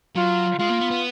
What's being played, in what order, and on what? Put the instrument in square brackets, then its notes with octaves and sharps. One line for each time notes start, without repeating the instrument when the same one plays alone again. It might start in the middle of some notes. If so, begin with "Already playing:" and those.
[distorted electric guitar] F#3 [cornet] F4
[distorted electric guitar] G#3 [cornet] F4
[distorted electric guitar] A#3
B3
B3